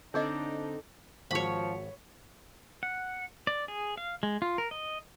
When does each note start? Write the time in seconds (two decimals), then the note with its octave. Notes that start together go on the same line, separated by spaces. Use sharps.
0.14 D3 C4 D4 D#4 A4 C#5 D#5 D6
1.31 G#1 F3 F#4 C#5 B5
2.83 F#5
3.47 D5
3.68 G#4
3.98 F5
4.23 G#3
4.42 F4
4.58 A#4
4.71 D#5